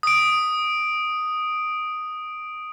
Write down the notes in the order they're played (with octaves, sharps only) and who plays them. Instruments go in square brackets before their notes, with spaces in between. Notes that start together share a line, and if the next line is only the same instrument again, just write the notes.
[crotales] D#6 D7